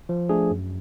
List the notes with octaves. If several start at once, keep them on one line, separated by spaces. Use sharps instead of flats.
F3
A3 D4 G#4
F#2